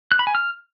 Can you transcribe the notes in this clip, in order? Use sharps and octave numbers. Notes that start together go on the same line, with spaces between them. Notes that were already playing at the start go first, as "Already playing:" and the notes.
F#6
B5
G#5
F6